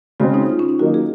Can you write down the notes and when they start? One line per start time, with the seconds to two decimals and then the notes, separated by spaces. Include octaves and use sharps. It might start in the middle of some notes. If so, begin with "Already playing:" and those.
0.20 C#3 G#3 C4 F#4
0.34 D#4
0.49 F4
0.59 C#4
0.69 D#4
0.79 D#3 F#3 A#3 D#4 F#4
0.94 G#4